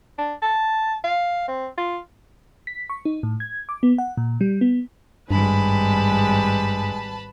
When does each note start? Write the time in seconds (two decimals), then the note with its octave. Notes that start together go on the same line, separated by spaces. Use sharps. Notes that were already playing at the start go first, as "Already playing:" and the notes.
0.18 D4
0.42 A5
1.04 F5
1.48 C4
1.78 F4
2.67 B6
2.90 C#6
3.05 D#4
3.23 A2
3.40 G#6
3.69 D6
3.83 B3
3.98 F#5
4.17 A#2
4.41 G3
4.61 B3
5.31 G#1 G2 G3 G#3 B4 A5 B5